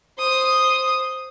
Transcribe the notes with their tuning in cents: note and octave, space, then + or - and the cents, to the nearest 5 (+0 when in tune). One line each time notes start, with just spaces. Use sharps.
C5 +0 D#6 +0